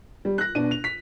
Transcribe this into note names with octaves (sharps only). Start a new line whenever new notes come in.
G3
F#6 A#6
B2 D4 D#7
F7
B6